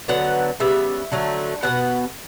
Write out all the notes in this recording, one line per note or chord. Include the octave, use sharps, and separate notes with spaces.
D3 F#3 B3 F#5
C#3 G3 B3 E5
D3 F#3 A3
B2 F#3 B3 F#5